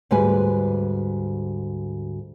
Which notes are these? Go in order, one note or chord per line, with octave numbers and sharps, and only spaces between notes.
D2 G#2 G3 B4 G#5